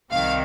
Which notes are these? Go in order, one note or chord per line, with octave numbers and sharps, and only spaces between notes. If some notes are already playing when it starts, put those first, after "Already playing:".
C2 C3 D#3 F5